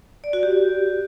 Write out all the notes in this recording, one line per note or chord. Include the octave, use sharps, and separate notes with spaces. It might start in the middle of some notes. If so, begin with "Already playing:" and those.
D5
F#4
G4